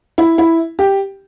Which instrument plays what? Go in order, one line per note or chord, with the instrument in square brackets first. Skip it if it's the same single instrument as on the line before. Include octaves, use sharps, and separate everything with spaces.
[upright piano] E4
E4
G4